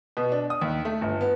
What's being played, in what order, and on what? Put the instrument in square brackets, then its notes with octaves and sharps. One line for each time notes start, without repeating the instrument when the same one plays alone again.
[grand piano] B2
D4
D#6
D#2
A3
G1
B3